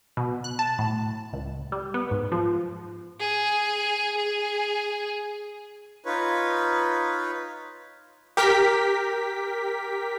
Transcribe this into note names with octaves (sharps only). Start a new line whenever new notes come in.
B2
F#6
A5
A2
C#2
G3
B3
G#2
F3
G#4
G#4
D#4 F4 B4 C#5
G4 A#4 B6